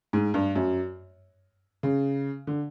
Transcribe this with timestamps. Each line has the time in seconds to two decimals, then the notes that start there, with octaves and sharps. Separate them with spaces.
0.13 G#2
0.34 G2
0.55 F#2
1.83 C#3
2.47 D3